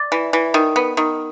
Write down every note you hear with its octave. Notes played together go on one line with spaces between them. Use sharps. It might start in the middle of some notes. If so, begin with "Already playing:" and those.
Already playing: D5
E3
E3
D#3
B3
D#3